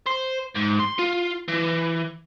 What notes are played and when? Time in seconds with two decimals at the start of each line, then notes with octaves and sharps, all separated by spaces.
0.06 C5
0.55 G#2
0.79 C6
0.98 F4
1.48 E3